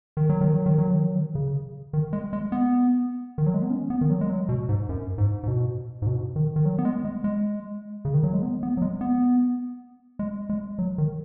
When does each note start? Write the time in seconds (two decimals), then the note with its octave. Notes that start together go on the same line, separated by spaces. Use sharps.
0.17 D#3
0.29 F#3
0.41 D#3
0.54 F#3
0.66 D#3
0.78 F#3
0.91 D#3
1.03 F#3
1.16 D#3
1.35 C#3
1.93 D#3
2.13 G#3
2.33 G#3
2.52 B3
3.38 D#3
3.46 F#3
3.54 G#3
3.62 B3
3.70 C#4
3.90 B3
4.01 D#3
4.10 F#3
4.21 G#3
4.30 F#3
4.49 B2
4.69 G#2
4.89 F#2
5.18 G#2
5.43 G#2
5.48 B2
6.02 G#2
6.07 B2
6.36 D#3
6.56 D#3
6.65 F#3
6.78 B3
6.85 G#3
7.05 G#3
7.24 G#3
8.05 C#3
8.14 D#3
8.23 F#3
8.34 G#3
8.43 B3
8.63 B3
8.77 F#3
8.82 G#3
9.01 B3
10.19 G#3
10.49 G#3
10.79 F#3
10.98 D#3